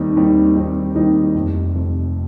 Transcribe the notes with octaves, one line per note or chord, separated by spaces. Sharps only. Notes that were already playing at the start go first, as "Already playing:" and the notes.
Already playing: D#2 D#3 G3 C4 D#4
D#2 D#3 G3 C4 D#4
D#2 D#3 G3 C4 D#4
D#2 D#3 G3 C4 D#4
F1 F2 C3
F1 F2 C3